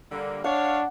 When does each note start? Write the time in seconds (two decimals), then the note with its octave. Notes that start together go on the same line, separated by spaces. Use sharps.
0.12 D3 G3 A#3
0.44 D4 C#5 F5 F#5